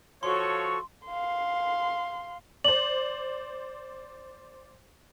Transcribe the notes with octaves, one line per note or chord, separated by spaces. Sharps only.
F3 F#4 A4 C#5 C6 C#6
F5 C6
C5 D5 F#7